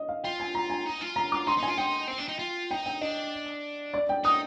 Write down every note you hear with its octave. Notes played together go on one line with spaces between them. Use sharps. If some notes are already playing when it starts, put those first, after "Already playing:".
Already playing: D#5
F5
F4 G5
G#5
A#5
G#5
D#4
F4
A#5
D6
D#4 C6
D#4 G#5
F4
D#4 G5
C4
D4
D#4
F4
D#4 G5
G5
D4 D#5
D5
G5
D#4 D#6